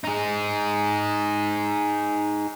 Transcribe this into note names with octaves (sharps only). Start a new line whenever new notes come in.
D#4 G#4